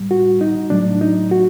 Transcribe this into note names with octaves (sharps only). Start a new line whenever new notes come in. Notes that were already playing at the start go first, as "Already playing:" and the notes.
Already playing: A2 G3
F#4
D#4
A2 F#3 A3 D4
D#4
F#4